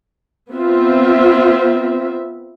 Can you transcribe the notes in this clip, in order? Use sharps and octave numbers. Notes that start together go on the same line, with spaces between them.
B3 C4 F4 E5